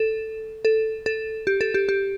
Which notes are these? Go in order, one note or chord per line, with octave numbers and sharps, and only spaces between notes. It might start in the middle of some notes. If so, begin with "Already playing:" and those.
Already playing: A4
A4
A4
G4
A4
G4
G4